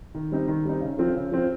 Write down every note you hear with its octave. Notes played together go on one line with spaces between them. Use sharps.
D#3
G3 C4 D#4
D#3
G3 C4 D#4
C#3
F3 C4 F4
C#3
F3 C4 F4